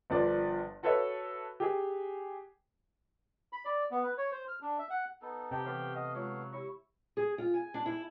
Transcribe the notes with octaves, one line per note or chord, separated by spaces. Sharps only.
G1 F3 D5
F#4 A4 B4 C#5 E5
G4 G#4
B5
D5
B3
B4
C#5
C5
F6
D4
E5
F#5
B3 D#4 A4
C3 G4 C5 D#5 A5
E3 A3 B3 C5 F5
D#5 F#5
F#3 G#3 F4 C#5
E4 G4 C#5 C#6
G#4
F4
G#5
D4
E4